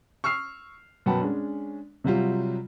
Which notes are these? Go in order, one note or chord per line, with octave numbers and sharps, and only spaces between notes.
C#6 E6 F6 C7
F#2 B2 F#5 G5 A5 B5
G#3 C#4 D4
C3 F#3 G3 F4